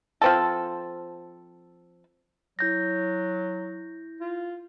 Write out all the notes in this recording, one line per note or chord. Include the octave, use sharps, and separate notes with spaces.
F3 C4 A4
F#3 E4 G6 A#6
F4